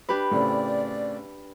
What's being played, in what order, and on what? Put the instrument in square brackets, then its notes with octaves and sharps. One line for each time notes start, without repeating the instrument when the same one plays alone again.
[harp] D4 G4 B4
[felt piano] A2 C#3 C4 [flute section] D5